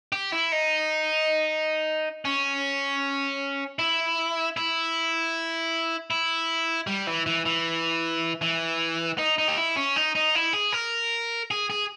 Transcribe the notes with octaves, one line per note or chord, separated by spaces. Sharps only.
G4
E4
D#4
C#4
E4
E4
E4
G3
E3
E3
E3
E3
D#4
D#4
G4
E4
C#4
D#4
D#4
E4
G#4
A#4
G#4
G#4